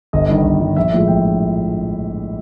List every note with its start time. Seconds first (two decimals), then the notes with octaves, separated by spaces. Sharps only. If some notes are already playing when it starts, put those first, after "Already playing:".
0.13 G1 D#5
0.29 G2 D#3
0.45 G1
0.60 G2 D#3
0.76 A#1 E5
0.92 A2 F3 G#3
1.08 A#1 G5